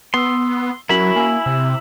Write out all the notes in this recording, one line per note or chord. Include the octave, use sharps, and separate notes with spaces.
B3 C6 D#6 E6
F#3 C#4 E4 F#4 A#4 B5
A#3 G#5 E6
C3 E6